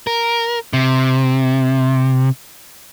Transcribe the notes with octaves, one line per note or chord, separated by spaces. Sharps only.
A#4
C3